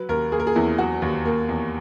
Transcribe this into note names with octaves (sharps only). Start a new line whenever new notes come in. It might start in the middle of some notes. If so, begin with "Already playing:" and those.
Already playing: F#3 B4
D#2 A#4
A#3 G#4
A#4
G#4
E2 E4
F#3 F#4
D#2
A#3
E2